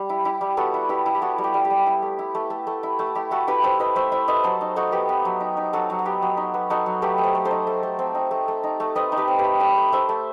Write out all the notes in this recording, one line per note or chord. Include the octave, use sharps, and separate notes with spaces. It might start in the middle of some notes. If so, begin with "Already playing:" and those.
Already playing: G3
E4
E4 G4
G3
B3 F#4 A4
E4
E4 G4 B4
E4
G4
B3 F#4 A4
G3
G4
G3
G4
G3
E4
A3
E4
A3
A3
A3
E4
A3
E4 G4
E4 F#4 A4
E4 G4 B4
E4 A4 C5
E4 B4 D#5
A3 C5 E5
E4 C5 E5
A3 B4 D#5
F#3 A4 C5
D#4
D#4 F#4 A4
B3 G4 B4
B3
F#3
D#4
D#4
F#3 F#4 A4
F#3
F#4
B3 G4
F#3
D#4
B3
D#4 F#4 A4
F#3
A3 G4 B4
A3
A4 C5
A3
A4 C5
D#4
A3
A3
C4
D#4
A3
A3
D#4
A3
C4 B4 D#5
D#4
G4 B4
C4
G4 B4
A3
A3 B4 D#5
A3
A3 C5 E5
A3